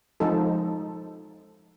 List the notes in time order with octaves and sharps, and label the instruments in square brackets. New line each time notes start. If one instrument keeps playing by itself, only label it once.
[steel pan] F3 G#3 D#4 A4